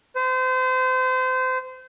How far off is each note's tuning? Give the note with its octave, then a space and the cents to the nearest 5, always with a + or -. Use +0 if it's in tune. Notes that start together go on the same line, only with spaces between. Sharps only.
C5 -30